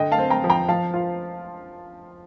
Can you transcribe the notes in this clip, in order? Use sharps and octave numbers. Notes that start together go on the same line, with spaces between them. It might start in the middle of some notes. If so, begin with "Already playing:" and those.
Already playing: D3 D#5 G5
F5 A5
C4
G5 A#5
F3
G5 A#5
F3 F5 A5
F4